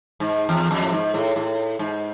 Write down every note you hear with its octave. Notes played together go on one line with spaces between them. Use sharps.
G#2
E2
F2
A2
G#2
A2
A2
G#2